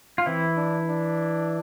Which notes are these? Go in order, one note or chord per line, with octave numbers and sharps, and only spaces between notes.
F4
E3 C4 E4
D4
D4